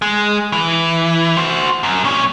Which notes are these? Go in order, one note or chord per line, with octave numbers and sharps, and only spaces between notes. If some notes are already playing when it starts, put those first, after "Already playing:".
G#3
E3
F#4 C5
F#2
A#2 C#4